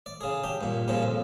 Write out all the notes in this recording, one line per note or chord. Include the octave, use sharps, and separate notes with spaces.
D5
C#3 G#4
D4 G4
G2 A#2
G2 A#2 C#3 F3
F2